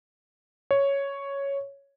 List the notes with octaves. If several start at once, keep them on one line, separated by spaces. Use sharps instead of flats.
C#5